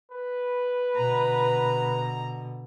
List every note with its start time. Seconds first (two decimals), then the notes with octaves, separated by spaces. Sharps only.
0.11 B4
0.97 B2 D3 A#5